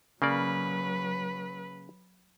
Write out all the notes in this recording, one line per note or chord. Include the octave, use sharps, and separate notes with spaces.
C#3 F#3 A#3 B4 D5